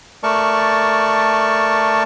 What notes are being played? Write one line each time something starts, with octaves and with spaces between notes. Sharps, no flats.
A3 A#4 D5 A5 C#6